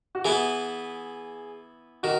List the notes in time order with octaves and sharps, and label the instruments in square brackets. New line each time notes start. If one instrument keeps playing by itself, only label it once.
[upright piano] F#4
[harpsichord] E3 B3 E4 [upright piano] G#4
[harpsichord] D#3 [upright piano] F#4